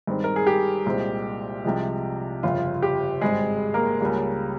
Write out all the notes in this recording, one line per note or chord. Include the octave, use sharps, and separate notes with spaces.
G2 D#3 G#3 C4
A#4
G#4
G4
C2 A#2 G#3 C4
C2 C3 F3 G#3
G1 F2 C#3 F4
G4
G#1 G2 G3 G#3 C4 G#4
A#3 A#4
C#2 C#3 G3 A#3